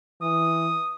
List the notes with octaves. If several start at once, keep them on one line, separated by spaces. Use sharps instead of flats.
E3 D#6